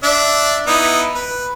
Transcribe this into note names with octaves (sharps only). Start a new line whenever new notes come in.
D4 D5 E5
B3 D#4 E4
B4